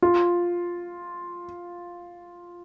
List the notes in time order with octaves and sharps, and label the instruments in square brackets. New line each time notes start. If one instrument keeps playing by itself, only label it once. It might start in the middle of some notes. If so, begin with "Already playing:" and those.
[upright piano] F4